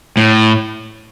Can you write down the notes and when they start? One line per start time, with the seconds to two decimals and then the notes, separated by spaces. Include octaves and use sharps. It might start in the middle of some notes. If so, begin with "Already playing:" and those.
0.17 A2